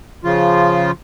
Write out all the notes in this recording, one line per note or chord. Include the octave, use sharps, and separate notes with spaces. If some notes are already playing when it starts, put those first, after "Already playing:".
C#3 F3 F4